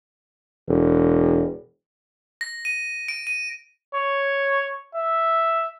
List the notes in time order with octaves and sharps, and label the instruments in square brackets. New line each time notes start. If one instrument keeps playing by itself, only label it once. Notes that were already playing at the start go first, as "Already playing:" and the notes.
[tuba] E1
[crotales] A#6
D#7
D7
D#7
[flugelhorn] C#5
E5